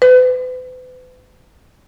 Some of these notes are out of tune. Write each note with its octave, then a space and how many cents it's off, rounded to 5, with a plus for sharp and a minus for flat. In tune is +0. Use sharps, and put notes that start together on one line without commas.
B4 +40